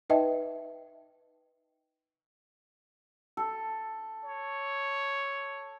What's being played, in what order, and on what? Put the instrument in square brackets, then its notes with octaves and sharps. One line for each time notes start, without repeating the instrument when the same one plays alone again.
[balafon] D#4 B4 D#5 E5 G5 A5
[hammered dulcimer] A4
[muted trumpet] C#5